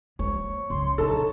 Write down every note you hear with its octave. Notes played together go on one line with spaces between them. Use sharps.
G#3 A#3 C#5
C#2 C6
A#1 D#4 A4 A5